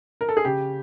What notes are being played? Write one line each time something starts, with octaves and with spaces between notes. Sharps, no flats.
A#4
A4
G#4
C#3 G4